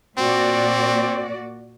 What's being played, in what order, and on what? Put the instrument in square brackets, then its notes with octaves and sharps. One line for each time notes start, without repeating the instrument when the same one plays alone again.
[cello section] A#2 F#4 D5 [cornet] C4